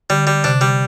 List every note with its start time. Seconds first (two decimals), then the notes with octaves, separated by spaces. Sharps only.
0.10 D3 G3
0.27 G3
0.44 C3 D4
0.61 G3